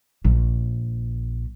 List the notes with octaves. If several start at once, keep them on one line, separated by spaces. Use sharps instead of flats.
A#1